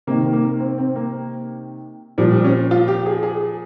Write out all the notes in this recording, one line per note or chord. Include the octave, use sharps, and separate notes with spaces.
C3 D#3 A#3
A#3
C4
C4
A#3
A#2 F3 G3
G3
C#4
F4
G4
G#4
G#4